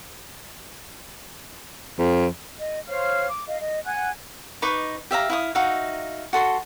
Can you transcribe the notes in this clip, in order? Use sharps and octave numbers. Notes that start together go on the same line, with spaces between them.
F2
D#5
C5 C#5 F5 F6
D6
D#5 F5
D#5
F#5 G#5 F#6
D#4 B4 C#6 D6
G4 E5 F5 A#5
E4 F5 D#6
D#4 F#4 E5 F5
F#4 A4 C6